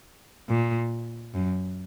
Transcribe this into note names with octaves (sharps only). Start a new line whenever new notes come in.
A#2
F#2